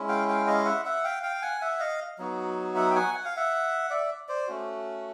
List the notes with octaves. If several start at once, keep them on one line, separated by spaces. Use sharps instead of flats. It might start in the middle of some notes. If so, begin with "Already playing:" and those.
Already playing: G#3 C#4 E4
F5 G5
F5 G5
D#5 F5
E5 F#5
E5 F#5
F5 G5
F5 G5
F#5 G#5
E5 F#5
D#5 F5
F#3 B3 D#4 F#4
E5 F#5
G5
F#5 G#5
F#5
F5
E5 F#5
D5 E5
C5 D5
A3 C#4 F#4